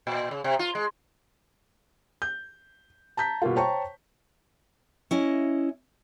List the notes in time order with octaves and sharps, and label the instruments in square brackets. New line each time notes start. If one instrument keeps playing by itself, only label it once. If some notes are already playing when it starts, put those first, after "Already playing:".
[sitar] A#2
C#3
C3
F4
G#3
[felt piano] G6
A5 A#5 G6 B6
B2 G3 A#3 F4
C5 C#5 G5 A5 A#5 C#6
[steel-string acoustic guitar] C#4 E4 D#5